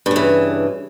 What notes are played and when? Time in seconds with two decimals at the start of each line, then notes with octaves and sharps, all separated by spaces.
0.06 G2
0.11 C#3
0.16 E3